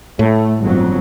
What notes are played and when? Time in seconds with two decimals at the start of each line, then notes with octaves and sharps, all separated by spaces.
0.19 A2 A3
0.62 G1 F2 F#3